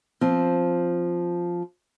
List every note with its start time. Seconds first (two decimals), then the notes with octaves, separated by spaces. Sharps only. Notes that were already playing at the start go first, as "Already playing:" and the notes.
0.21 F3 C4